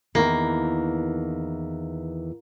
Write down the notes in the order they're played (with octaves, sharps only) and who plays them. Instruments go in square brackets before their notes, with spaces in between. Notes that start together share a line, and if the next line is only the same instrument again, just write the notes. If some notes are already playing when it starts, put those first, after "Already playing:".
[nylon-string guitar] E2 D#3 E3 [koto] A#3